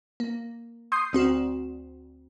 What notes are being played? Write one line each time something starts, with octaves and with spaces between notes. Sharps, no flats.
A#3
C6 D#6 G6 C7
D2 C4 F#4 E7